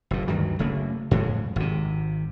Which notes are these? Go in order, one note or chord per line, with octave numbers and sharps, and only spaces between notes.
F#1 A2
D2 G2 D#3 F#3
F#1 C#3 A3 A#3
F2 A2 G#3
G#1 C3